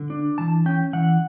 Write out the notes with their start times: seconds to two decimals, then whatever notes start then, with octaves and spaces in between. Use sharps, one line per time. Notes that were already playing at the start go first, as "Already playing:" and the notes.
Already playing: D3
0.10 D4
0.38 E3 A5
0.66 C#4 G5
0.93 E3 F#5